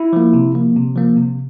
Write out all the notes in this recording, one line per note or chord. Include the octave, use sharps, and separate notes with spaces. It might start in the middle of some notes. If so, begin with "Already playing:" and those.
Already playing: E4
F3 A#3
C3
F3 A#3
C3
F3 A#3
C3